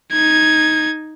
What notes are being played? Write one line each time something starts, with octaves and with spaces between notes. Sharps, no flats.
D#4 G#6